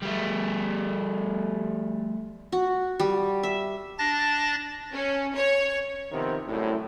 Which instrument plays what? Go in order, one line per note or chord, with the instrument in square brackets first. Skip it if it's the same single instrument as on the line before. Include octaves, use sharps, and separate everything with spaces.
[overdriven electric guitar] G3 A3
[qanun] F#4
G3
E5
[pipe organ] D4 A5 A6 A#6
[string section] C#4
C#5
[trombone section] C3 D#3 F3 B3 C4
C2 F#2 A2